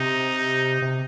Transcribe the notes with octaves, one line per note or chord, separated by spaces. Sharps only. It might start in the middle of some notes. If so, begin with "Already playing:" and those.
Already playing: C3 D#4
C3